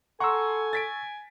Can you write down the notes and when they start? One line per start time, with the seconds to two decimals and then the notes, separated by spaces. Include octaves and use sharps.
0.20 A4 F#5 G#5 A#5 C6 C#6 E6
0.73 A6 B6 D7